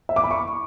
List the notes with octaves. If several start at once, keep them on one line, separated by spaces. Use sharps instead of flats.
E5
D6
B5
C#6